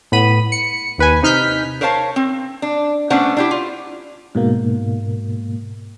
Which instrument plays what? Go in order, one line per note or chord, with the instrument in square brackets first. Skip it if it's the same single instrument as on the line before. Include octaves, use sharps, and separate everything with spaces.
[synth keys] A2 B3 B5 D#7
C#7
D#2 B4 G#5
C3 D#4 F6 G6 B6
[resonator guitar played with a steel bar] A#4 C5 C#5 F5 A5
C4
D4
A3 B3 C#4 D4 C5 F#5
D4 E4 G4
F4
[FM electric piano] G#2 B2 A#3